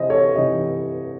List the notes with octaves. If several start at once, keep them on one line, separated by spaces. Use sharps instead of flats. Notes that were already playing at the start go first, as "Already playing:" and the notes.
Already playing: C3 E3 C5 D#5
A4 C#5
C3 E3 D#4